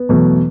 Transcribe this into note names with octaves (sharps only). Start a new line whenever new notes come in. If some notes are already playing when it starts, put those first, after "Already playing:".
Already playing: B3
E2 B2 F#3 A3